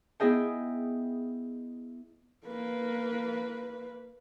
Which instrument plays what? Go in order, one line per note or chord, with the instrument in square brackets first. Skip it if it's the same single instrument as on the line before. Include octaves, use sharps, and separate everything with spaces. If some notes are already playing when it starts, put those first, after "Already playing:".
[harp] B3 E4 G#4 D#5 G5
[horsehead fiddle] A#3 B4